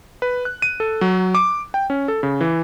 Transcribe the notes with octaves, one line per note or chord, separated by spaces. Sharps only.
B4
F#6
D#7
A4
F#3
D6
G5
C#4
A4
C#3
E3